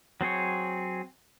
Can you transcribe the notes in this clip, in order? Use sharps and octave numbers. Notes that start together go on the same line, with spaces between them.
F#3 C4 G#4 C#5